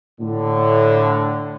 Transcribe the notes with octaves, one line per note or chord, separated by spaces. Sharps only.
A2 D3